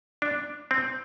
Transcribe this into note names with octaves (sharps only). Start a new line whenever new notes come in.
D4
C4